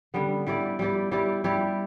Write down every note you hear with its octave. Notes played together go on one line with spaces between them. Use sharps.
D3 G3 B3
G3 E4 G4 D5
G3 E4 G4 D5
G3 E4 G4 D5
G3 E4 G4 D5